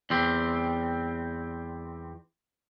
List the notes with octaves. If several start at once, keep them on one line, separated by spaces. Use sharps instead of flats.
E2 G3 C4